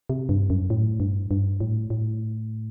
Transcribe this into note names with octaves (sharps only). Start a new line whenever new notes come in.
C3
G2
F#2
A2
G2
G2
A2
A2